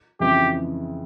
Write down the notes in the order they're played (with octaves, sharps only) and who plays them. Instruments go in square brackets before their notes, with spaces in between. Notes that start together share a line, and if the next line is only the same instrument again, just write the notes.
[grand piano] F2 C#3 E3 G#3 E4 [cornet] G4